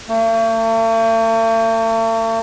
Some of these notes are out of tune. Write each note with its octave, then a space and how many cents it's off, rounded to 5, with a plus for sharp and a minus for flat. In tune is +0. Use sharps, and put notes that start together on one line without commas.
A3 +45